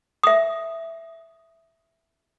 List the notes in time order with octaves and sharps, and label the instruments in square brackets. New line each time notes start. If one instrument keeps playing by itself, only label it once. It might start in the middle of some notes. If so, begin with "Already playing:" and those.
[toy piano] E5 D#6